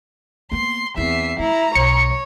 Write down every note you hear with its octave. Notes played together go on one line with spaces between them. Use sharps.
A#3 B3 C6
E2 C4 E4 E5 C7
A3 E4 A#5
B1 C#5 C#7